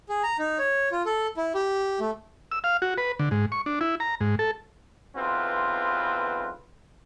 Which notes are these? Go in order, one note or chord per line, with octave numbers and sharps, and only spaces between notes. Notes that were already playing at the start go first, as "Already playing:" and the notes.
G#4
A#5
D#4
C#5
F4
A4
E4
G4
A3
E6
F5
F#4
B4
D3
G#2
C#6
D4
E4
A#5
G#2
A4
B1 E2 C4 F4 B4